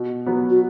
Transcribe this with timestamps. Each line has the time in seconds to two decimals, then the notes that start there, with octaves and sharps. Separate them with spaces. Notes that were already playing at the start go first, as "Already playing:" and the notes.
Already playing: B2
0.26 F#3 B3
0.50 F#4